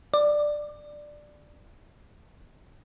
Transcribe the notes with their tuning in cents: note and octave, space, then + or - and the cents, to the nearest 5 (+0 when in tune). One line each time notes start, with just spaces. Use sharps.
D5 +10